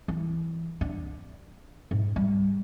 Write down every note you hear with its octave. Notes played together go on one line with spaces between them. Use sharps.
E3
D4
G#2
G3